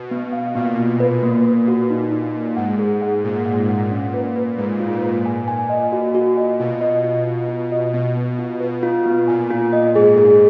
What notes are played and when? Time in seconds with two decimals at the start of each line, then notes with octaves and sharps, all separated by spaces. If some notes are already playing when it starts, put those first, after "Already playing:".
Already playing: B2
0.11 B3
0.33 F5
0.55 A#2 B3
0.77 F4
1.00 B4
1.23 A#3
1.45 B4
1.68 F#4
1.90 D#4
2.12 D#4
2.34 D#4
2.57 G#2 F#5
2.79 G#4
3.02 F#5
3.24 A#2 G#4
3.46 F#5
3.69 F#5
3.91 C#4
4.14 B4
4.36 B4
4.58 G#2 B4
4.80 F4
4.92 A#2
5.03 B4
5.26 G#5
5.48 G#5
5.70 D#5
5.92 F#4
6.15 F#4
6.38 D#5
6.59 B2 F4
6.81 D#5
7.04 F4
7.27 F4
7.48 F4
7.72 D#5
7.93 B2 B3
8.17 B3
8.39 F4
8.60 B2 B4
8.83 F4
9.06 B3
9.28 A#2 G#5
9.51 F4
9.73 D#5
9.95 G#2 G#4
10.18 G#4